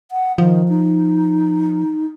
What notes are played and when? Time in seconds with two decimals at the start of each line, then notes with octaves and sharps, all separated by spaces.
0.11 F#5
0.38 D#3 F3
0.69 D#4